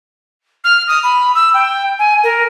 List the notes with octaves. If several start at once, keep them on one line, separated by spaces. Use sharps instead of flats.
F6
D#6
B5
E6
G5
G#5
A#4